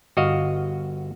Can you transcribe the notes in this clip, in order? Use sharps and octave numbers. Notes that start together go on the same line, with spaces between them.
G1 F#4 D#5 F5